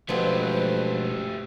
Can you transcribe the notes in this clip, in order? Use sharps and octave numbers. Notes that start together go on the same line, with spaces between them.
E1 F3 F#3 A3 G4 B4